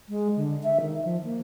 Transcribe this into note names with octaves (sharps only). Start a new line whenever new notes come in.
G#3
D3
E5
D#3
F3
A#3